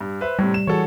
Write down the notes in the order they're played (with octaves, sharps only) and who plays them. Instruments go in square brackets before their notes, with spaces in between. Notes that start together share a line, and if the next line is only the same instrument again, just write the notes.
[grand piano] G2
B4 C5 E5
[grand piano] A2 C3 [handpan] G3
[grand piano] E7
[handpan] E3 F#4 G#4 [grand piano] A4 C#5